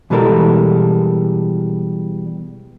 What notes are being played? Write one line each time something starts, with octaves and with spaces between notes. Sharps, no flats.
B2 E3 G3 G#3 A4 A#4